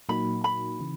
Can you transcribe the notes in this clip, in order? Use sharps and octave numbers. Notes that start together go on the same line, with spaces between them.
A#2 F#3 A#3 D#4 F#4 B5
B5
C#3 E3